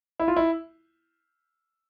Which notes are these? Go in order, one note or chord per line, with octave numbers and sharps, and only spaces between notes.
E4
F4
E4